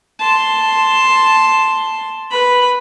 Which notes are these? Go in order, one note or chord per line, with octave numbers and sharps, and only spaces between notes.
A5 C6
B4 B5